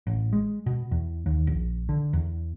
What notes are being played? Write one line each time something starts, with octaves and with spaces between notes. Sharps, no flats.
A1
G#3
B2
E2
D#2
A#1
D3
E2